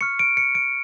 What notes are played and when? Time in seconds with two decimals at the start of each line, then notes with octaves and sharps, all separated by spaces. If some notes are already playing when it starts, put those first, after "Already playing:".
0.01 C#6 F6 C#7
0.19 D7
0.37 C#7
0.55 D7